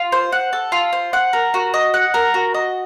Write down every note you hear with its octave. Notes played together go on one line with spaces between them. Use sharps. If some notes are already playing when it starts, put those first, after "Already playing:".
Already playing: F4
C5
F#5
A4
F4
C5
F#5
A#4
F#4
D#5
F#5
A#4
F#4
D#5